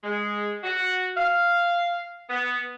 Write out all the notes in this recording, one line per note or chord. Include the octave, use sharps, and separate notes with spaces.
G#3
F#4
F5
B3